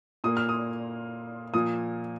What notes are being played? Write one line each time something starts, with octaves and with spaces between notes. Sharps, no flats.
A#2 A#3 D#6
F6
D#6
A#2 F3 A#3 D#6